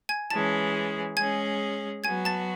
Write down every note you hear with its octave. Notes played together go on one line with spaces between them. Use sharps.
G#5 G#6
E3 G#3 C#4 G#4 A5 A6
G#3 C#4 G#4 G#5 G#6
F#3 B3 F#4 G#5 G#6
A5 A6